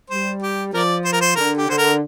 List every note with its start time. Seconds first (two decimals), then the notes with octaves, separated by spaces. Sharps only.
0.10 G3 C5
0.43 G4
0.73 F3 A#4 D5
1.05 C5
1.13 A#4
1.21 C5
1.36 D3 A#4
1.57 G4
1.68 D3 C5
1.78 A#4